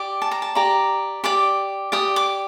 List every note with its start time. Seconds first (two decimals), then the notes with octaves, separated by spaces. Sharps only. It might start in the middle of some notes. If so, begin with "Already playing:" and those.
Already playing: G4 D5
0.22 A5
0.31 A#5
0.42 A5
0.55 G4 D5 A#5
1.24 G4 D5 D6
1.92 G4 D5 D#6
2.16 D6